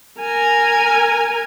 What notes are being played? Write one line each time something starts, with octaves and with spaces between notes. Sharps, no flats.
A#4 G#5